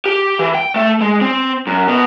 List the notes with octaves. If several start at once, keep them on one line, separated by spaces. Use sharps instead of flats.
G4
E3
G5
A3
G#3
C4
F#2
B2